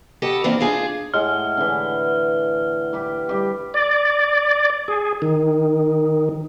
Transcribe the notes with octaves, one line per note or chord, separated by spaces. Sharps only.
G4 A4 B4 D#5 F#5
E3 A#3 C4 D4 E4 F4
D4 D#4 F4 G#4
A2 G#3 F#5 F6
D3 E3
G4 B4 D6
G3 G4
D5
G#4
D#3